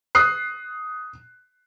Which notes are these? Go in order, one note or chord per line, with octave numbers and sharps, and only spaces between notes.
D#6 F#6 C7